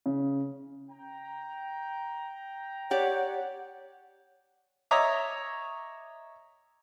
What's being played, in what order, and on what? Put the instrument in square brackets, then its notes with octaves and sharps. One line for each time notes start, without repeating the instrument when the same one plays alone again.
[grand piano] C#3
[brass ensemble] G5 A#5
[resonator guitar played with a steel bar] G4 D5 [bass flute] C#5 [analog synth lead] F#5
[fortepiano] C#5 D#5 E5 A#5 D6 D#6